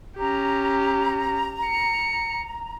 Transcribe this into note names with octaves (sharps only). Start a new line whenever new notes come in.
C#4 G4 A#5
C#7